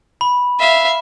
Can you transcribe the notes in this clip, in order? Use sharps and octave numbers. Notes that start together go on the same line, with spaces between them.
B5
E5 F5